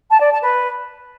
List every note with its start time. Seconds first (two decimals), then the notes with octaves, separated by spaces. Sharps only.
0.11 A5
0.21 D5
0.31 A5
0.42 B4